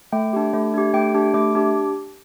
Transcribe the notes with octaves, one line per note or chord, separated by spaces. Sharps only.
A3 G5
D4 G4
A3
D4 G4
A3 G5
D4 G4
A3 D6
D4 G4